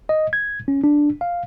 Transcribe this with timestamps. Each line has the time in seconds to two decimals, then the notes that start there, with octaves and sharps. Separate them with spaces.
0.09 D#5
0.33 G#6
0.68 C#4
0.84 D4
1.21 F5